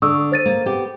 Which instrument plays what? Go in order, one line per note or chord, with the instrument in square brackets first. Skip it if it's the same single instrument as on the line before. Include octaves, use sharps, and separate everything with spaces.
[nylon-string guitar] D3 [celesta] C#6 D#6 E6
[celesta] C5 A6 D#7
[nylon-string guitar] A#3
B3 G4